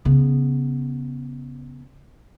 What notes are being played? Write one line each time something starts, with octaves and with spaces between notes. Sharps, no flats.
C#3 B3